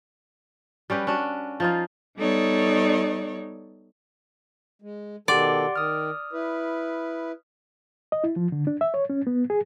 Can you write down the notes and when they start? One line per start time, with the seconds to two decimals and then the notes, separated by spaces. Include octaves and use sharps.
0.90 G3 C#4 G4 B4
1.07 C#4 D4 F#4
1.60 F3 D#4 F4
2.18 G3 B3 D#4 A4 C#5 D5
4.82 G#3
5.28 B2 D#3 G4 A4 D5 F#5 C6
5.76 D#3 D#6 F6
6.33 E4 B4
8.12 D#5
8.24 E4
8.36 F3
8.52 D3
8.67 D4
8.81 E5
8.94 C#5
9.10 C#4
9.27 B3
9.50 G#4